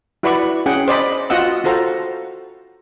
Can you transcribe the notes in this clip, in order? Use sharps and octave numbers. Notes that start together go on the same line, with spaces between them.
E4 F#4 B4 D5 B5 C#6
C#4 G#4 F#5 G5
C5 D5 D#5 B5
F4 F#4 D#5 F#5 E6
F4 F#4 A4 C5 A#5